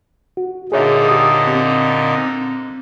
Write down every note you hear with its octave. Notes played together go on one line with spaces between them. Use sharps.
F#4
A#2 D3 D#4 G#4 C#5 E5
G4 D#6
C4
C4